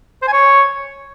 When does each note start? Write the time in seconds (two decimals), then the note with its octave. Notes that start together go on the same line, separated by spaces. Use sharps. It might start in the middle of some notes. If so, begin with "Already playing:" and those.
0.22 C5
0.27 G#5
0.33 C#5